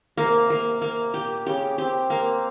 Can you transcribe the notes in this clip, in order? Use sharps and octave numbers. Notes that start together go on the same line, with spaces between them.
C3 A#3
A#3
C3 A#3
A#2 G4
C#3 G4
C4 G4
A#3